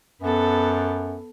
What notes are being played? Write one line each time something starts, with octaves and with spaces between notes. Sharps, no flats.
F#2 B3 A4